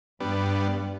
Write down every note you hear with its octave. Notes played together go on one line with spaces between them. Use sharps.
G2 G3 B3 D4